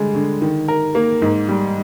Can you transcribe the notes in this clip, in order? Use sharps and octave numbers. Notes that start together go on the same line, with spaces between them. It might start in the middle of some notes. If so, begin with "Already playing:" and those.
Already playing: D3 G3 G#3
D3
D#3
A#4
A#3
G#2
G3